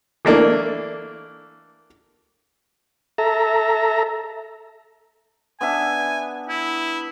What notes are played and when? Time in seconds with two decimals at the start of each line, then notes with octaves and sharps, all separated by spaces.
0.25 E3 A3 A#3 D4
3.18 A4 E5 A#5
5.61 B3 D4 E5 G#5
6.49 E4